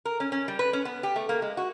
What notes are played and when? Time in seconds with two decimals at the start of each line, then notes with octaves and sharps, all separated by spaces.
0.05 A#4
0.20 C#4
0.32 C#4
0.48 G3
0.59 B4
0.73 C#4
0.85 B3
1.03 G4
1.16 A3
1.29 A#3
1.42 G#3
1.57 F#4